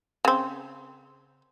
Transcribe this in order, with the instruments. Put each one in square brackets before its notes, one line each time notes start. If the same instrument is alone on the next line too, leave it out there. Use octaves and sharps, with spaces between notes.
[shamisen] C#3 C4